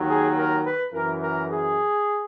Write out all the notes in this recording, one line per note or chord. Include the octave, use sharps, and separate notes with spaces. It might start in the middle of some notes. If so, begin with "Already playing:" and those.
Already playing: D#2 D#3 F#3
G#4
A#4
B4
F#2 E3 A#4
A#4
G#4